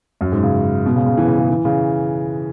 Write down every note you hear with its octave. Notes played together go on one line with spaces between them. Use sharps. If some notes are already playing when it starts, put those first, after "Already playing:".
F#2
G#2
C#3
B2
C#3
C#3
E3
C#3
C#3
E3
C#3